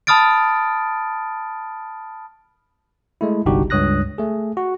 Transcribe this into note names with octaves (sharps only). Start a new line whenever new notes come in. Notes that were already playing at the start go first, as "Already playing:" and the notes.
A5 B5 D#6 F6 A6 D7
G#3 A3 E4
G1 C2 D4 D#4 F#4 G4
C#2 G2 C#5 D#6 F#6 A#6
A3 G#4
F#4